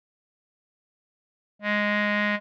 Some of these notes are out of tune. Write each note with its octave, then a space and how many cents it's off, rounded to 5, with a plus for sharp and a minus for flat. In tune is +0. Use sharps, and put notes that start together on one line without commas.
G#3 +0